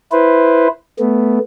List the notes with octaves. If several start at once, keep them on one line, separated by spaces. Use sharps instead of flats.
E4 B4 C5
A3 B3